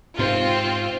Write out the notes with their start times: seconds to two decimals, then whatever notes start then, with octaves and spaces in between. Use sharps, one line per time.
0.19 G#2 C3 C4 F4